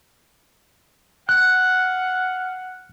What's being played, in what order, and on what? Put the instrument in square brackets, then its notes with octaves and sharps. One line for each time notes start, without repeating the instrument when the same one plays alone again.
[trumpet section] F5 F#5 [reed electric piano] F#6